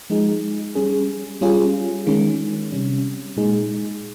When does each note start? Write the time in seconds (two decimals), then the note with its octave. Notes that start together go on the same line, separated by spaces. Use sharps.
0.10 F3 G#3 D#4 G#4
0.75 G3 C#4 G#4
1.41 G3 C#4 F4 G#4
2.07 D#3 G#3 C#4
2.72 C3 G3 C#4
3.37 A#2 G#3 D#4 G#4